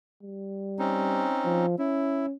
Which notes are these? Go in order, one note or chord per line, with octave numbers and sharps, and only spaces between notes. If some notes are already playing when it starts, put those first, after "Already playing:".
G3
C4 C#4 D#4
F3
C#4 E4